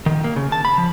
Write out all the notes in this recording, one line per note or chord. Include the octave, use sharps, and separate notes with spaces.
D#3
A#3
C#3
A5
B5
F3